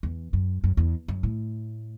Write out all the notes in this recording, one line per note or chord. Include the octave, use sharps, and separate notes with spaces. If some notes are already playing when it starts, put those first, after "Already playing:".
E2
F#2
F#2
E2
F#2
A2